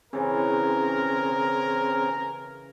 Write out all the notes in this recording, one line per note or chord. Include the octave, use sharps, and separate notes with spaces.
C#3 E3 C4 C#4 G#4 A#4